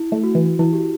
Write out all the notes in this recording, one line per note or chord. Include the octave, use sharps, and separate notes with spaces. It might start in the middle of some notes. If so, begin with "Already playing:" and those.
Already playing: E4
A3
F#4
E3
E3 E4
G4